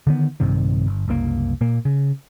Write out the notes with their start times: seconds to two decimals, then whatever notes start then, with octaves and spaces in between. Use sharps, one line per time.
0.07 D3 D#3 B3
0.40 A#1 G2 C3 D#3
0.87 G1
1.08 F#1 C2 C#3 A#3
1.61 A#2 A#3
1.85 C#3